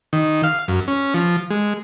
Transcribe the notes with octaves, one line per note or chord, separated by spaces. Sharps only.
D#3
F5
F#2
C#4
F3
G#3